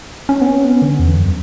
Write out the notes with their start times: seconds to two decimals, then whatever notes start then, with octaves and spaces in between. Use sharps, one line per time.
0.29 C#4
0.41 B3
0.47 C#4
0.64 B3
0.82 D3
0.99 E2
1.17 F#2